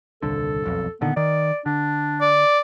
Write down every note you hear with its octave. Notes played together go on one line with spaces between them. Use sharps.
D#1 C2 D3 A4
E1 B1 F2
A#2 D3 D#3 B3
D#3 D5
D3 D4
D5